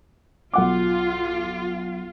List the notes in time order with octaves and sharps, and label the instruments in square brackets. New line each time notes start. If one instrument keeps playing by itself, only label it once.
[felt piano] B1 F#5 D6 [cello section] F4